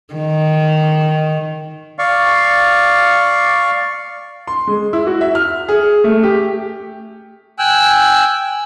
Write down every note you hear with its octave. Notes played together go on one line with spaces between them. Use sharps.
D#3
D5 F5 C#6
C6
G#3
E4
F#4
E5
F6
G#4
A3
G4
G5 G#5 E6 F#6